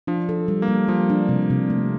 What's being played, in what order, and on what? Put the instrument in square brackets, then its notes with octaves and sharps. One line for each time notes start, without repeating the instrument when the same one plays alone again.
[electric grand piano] F3 [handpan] D4
[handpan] A4
G3
[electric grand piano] A#3
[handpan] G3
[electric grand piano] F3 [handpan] G3
[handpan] D4
C3
C3
A3